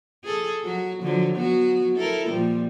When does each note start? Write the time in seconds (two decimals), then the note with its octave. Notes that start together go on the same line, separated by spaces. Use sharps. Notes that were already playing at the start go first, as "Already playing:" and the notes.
0.24 G#4 A4
0.64 F#3 F#4
1.03 D3 F3 F#3
1.36 F#3 B3 F#4
1.96 E4 A4 A#4
2.28 A#2 F3 G3